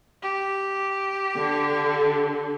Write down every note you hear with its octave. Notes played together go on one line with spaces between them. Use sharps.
G4
D3